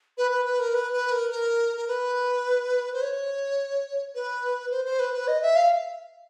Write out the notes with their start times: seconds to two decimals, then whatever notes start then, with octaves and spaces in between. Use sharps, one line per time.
0.18 B4
0.31 B4
0.45 B4
0.59 A#4
0.74 B4
0.93 B4
1.12 A#4
1.31 A#4
1.77 A#4
1.88 B4
2.94 C5
3.01 C#5
4.15 B4
4.71 C5
4.85 C5
4.99 B4
5.14 B4
5.28 D#5
5.42 E5
5.56 F5